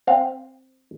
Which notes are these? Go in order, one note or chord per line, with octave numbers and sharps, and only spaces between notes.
C4 F5